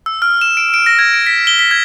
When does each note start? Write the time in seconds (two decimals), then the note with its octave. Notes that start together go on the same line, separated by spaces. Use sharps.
0.06 E6
0.22 F6
0.41 E7
0.57 D7
0.74 D7
0.86 A#6
0.99 G#6
1.14 D7
1.27 B6
1.47 G7
1.59 B6
1.71 G#6